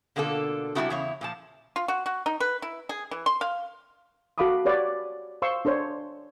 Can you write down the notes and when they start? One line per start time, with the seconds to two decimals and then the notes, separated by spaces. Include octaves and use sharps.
0.16 B2 D3 A#3 F4 A4
0.75 C3 G3 D#4 E4 F#4 A4
0.90 E2 C#3 E4 C#5
1.21 A#2 F3 A5
1.76 F4
1.88 F#4
2.06 F#4
2.26 D#4
2.40 B4
2.62 E4
2.89 G#4
3.11 E3
3.26 C6
3.41 F5
4.38 F#4 A4 F5 B5 D6 D#6
4.65 G4 B4 C#5 D5 F#5
5.42 C5 F5 C6 C#6 E6
5.65 D4 A4 C5 C#5